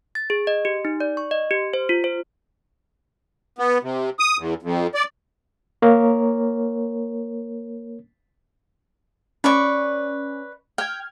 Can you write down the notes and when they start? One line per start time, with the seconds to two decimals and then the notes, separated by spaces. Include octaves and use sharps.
0.15 A6
0.30 G#4
0.47 D#5
0.65 G4
0.85 D#4
1.00 D5
1.17 C#6
1.31 D#5
1.51 G4
1.74 C5
1.89 F4
2.04 C5
3.59 B3
3.83 C3
4.19 D#6
4.38 E2
4.62 F2
4.94 D5
5.82 A#3 A#4 C#5
9.44 C#4 B4 D5 C#6
10.78 G5 F6 G#6